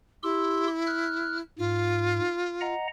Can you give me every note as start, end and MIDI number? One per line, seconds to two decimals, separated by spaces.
0.23 1.41 64
0.23 0.68 67
0.23 0.68 84
0.23 0.68 88
0.87 1.37 89
0.87 1.37 90
1.58 2.20 44
1.58 2.74 65
2.61 2.87 75
2.61 2.87 78
2.61 2.87 82